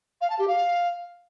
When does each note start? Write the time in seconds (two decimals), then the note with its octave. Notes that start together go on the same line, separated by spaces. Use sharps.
0.21 F5
0.30 A5
0.38 G4
0.47 F5